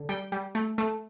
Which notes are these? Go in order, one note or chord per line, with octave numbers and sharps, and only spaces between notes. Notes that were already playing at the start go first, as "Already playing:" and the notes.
Already playing: D3
G3 G5
G3
A3
A3